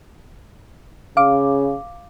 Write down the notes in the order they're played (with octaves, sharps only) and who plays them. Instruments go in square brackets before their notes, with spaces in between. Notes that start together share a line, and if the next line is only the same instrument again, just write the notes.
[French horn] C#3 [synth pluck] F5 D6